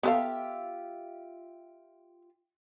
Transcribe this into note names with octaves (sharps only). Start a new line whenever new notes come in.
B3 F4 G4 A4 E5 F5